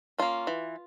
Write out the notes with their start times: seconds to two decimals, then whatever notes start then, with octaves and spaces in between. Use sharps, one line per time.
0.18 A#3 C#4 F4
0.47 E3